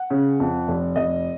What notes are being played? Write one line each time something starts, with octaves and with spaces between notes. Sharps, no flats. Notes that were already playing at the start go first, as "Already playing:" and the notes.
Already playing: F#5
C#3
F2
F1
F1 D#5